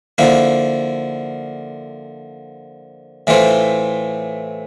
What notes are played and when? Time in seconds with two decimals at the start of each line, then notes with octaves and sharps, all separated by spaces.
0.18 D3 F3 A#3 E4
3.27 A2 E3 A3 C4 F4